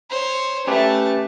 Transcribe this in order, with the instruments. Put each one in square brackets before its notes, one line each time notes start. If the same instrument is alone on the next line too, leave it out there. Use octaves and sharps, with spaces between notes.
[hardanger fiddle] C5 C#5
[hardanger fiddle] A3 A5 [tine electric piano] C#4 G4 B4